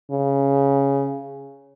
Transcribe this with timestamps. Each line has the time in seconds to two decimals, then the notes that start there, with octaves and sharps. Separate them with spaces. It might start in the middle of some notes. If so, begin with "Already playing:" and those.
0.11 C#3